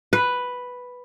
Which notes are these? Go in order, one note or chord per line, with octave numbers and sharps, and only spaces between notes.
B4